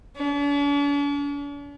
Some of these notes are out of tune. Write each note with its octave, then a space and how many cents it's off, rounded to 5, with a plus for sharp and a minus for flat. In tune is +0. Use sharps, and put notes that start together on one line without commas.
D4 -45